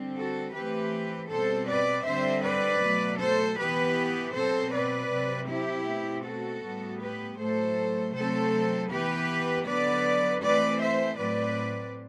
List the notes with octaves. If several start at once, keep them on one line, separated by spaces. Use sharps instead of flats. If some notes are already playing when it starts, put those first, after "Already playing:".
Already playing: D3 G3 C4
F#4 A4
E3 A3 C4 G4 B4
B2 G3 C4 A4 C5
B4 D5
D3 G3 C4 C5 E5
B4 D5
B2 F#3 A3
A4 C5
E3 B3 G4 B4
B2 F#3 C4 A4 C5
B4 D5
C3 F#3 C4
E4 G4
B2 A3 C4
F#4 A4
A2 G3 B3
G4 B4
A2 F#3 A3 A4 C5
C3 F#3 A3 C4 A4 C5
E3 B3 G4 B4
D3 F#3 B3 B4 D5
E3 A3 C4 B4 D5
C5 E5
A2 F#3 C4 B4 D5